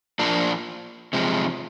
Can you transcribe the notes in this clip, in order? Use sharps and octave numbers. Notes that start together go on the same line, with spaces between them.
F3 A#3 D4
C3 F3 G#3